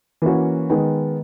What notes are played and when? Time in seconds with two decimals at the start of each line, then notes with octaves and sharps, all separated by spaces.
0.22 E3 A#3 C#4 F#4
0.70 D#3 G#3 B3